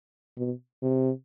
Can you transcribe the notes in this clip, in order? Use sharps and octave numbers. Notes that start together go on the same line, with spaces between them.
B2
C3